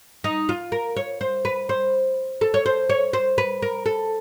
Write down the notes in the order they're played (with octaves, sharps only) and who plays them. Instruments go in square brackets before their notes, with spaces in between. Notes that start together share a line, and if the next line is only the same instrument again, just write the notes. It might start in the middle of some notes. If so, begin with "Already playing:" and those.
[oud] D#4
F4
A#4
C#5
C5
B4
C5
A4
C#5
C5
C#5
C5
B4
A#4
A4